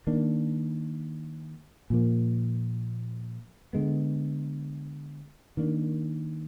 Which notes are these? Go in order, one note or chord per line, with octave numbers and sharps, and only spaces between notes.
D#3 A#3 D4
A#2 F3 A#3
D3 G#3 B3
D#3 A#3 D4